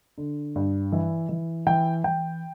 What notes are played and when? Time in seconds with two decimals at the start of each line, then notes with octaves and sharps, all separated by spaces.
0.18 D3
0.56 G2
0.92 E3
1.29 E3
1.67 E3 G5
2.04 E3 G5